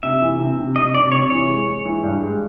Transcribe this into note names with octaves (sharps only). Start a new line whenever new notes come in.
C3 E5
E3
C3
C3
C3 D#5
C3 D5
C3 C#5
E3 C#5
G#3
G#3
E3
G2
G#3